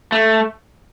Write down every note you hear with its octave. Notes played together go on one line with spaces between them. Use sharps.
A3